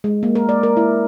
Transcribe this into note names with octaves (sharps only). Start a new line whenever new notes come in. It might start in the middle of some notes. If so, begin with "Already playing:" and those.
G#3
A#3
A#4
D5
A#4
E4